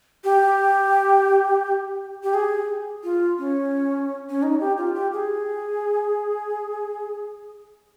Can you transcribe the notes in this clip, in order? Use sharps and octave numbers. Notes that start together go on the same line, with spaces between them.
G4
G4
G#4
F4
C#4
C#4
D#4
G4
F4
G4
G#4